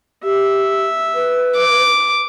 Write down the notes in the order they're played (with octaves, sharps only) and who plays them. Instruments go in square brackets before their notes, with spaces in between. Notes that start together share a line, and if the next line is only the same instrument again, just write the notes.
[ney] G4 [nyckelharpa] E5
[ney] B4
[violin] D6